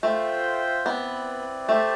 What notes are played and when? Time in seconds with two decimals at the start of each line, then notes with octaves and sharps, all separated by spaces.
0.03 A3 F4 C5 E5 G5
0.85 B3 C4 E4 B4 D5
1.68 A3 G4 C5 E5 A5